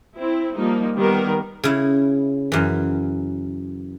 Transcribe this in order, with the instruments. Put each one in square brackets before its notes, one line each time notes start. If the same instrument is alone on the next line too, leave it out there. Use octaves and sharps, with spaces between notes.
[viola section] C4 E4
F3 G3 A#3 D#4
D#3 G3 B3 A#4
[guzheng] C#3 E4
F#2 E3